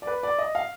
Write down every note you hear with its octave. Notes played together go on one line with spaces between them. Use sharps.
D5
B4
D5
D#5
F5